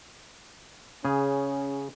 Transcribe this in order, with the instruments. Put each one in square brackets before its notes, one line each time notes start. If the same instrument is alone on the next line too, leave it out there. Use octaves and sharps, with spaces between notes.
[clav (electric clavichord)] C#3 G#4 [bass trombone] C#4